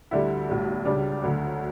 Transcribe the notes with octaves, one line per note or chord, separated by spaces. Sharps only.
D2 D3 G3 E4
B1 A2 G3
C#2 C#3 G3 D4
D2 D3 F#3